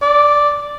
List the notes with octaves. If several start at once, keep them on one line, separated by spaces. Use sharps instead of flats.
D5